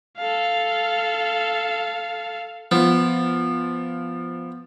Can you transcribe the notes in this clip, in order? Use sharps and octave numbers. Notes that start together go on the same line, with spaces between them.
A4 F5
F3 B3